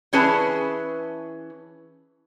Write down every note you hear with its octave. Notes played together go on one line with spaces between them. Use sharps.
E3 C#4 G#4 B4 A5